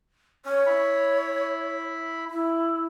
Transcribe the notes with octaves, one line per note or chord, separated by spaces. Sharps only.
C#4 C#5
E4 B5
E4